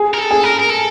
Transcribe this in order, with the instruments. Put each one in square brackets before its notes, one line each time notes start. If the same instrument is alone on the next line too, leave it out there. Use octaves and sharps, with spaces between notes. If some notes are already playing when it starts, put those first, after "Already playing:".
Already playing: [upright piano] G#4
[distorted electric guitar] A#4
A4
[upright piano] G#4
[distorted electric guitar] A#4
A#4
A4